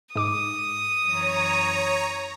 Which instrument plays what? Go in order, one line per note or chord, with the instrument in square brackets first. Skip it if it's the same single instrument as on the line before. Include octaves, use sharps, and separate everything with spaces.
[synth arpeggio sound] G#2 D6 [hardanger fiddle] D#6
[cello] F#2 E3 [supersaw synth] C#5 A#5